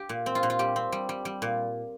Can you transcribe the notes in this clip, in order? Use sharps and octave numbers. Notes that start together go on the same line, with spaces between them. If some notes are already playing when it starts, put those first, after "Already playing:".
Already playing: G4
A#2
C4
F4
A#2
F4
G3 G4
C4
G3
G3
G3
A#2